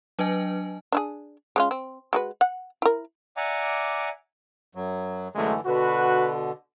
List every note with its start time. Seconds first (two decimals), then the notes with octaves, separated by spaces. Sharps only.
0.19 F#3 D4 B4 D#5 G#5
0.92 D4 E4 G#4
1.56 G#3 C#4 F4
1.71 C4
2.13 G#3 F#4 B4
2.41 F#5
2.82 E4 A#4
3.37 D5 E5 F#5 G#5 A#5 D6
4.75 F#2 F#3
5.35 F#2 D3 E3 G#3 A3
5.66 B2 D3 F#4 B4